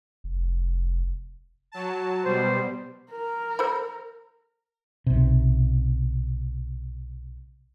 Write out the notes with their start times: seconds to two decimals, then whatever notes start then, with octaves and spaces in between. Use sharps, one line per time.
0.24 F1
1.72 F#3 A5
2.25 B2 G3 C5
3.11 A#4
3.59 A4 C5 B5
5.06 B1 C3